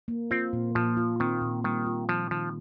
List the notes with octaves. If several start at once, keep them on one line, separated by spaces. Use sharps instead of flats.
A#3
C4 F4
A#2
A#2 F3
F4
D#3 C4
A#2
D#3 G3
F4
D#3 F3
D#3 F3